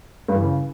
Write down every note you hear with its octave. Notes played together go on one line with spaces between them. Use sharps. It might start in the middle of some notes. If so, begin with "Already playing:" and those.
G2
E3
C#3